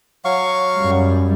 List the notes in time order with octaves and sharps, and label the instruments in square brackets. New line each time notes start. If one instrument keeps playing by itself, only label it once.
[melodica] F#3 F5 C#6
[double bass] F#2 G3